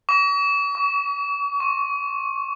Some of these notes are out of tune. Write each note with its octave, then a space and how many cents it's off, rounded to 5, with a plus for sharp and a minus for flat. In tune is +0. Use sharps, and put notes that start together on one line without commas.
C#6 +45
C#6 +35
C#6 -40